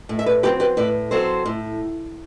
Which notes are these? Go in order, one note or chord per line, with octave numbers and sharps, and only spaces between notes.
A2
E5
B4 D5
F#3 C4 G4 B4
G4 B4
A2 B4 D5
F#3 C4 A4 C5
A2